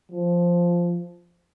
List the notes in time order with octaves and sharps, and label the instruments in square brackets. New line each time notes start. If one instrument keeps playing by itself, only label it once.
[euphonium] F3